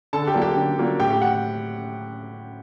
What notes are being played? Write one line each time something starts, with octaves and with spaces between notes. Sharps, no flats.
D3 A4 A5
G4 G5
F#3 A#3 D4
G4 G5
D3
F#3 A#3 D4
A2 G4 G5
G4 G5
F#5